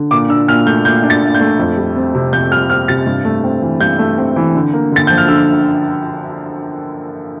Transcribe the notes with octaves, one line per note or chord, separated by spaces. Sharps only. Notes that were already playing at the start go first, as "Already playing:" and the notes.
Already playing: D3
A#2 D6
D4 E6
A#2 F6
A3 G6
A#2 G6
D4
A6
A#2
G6
A3
F2
G3
C4
C3
F2 G6
G3 F6
C4 F6
C3 A6
G2
A3
C4
E3
G2 G6
A3
C4
E3
D3
A#3
D3 A6
F3 G6
F6
D3 E6